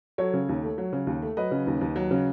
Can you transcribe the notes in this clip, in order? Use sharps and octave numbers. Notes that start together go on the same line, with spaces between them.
F#3 A4 C#5
C#3
D#2
A3
F#3
C#3
D#2
A3
F#3 B4 D#5
C#3
D#2
D#2
F#3
C#3